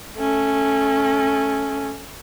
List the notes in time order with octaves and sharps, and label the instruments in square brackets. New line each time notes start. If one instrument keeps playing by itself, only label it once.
[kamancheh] A3 C#4